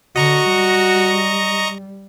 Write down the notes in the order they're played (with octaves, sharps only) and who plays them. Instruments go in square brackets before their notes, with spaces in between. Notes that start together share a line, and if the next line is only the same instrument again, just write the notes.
[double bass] D3 [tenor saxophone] F#4 [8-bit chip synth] D#5 A#5 C#6
[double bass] G3